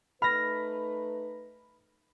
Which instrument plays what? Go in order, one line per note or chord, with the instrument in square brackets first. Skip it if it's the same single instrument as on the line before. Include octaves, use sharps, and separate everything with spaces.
[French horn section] A3 D#4 B4 [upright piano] B5 [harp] F6 A#6